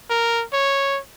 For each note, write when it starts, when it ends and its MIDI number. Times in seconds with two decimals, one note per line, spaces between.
0.10 0.44 70
0.53 1.00 73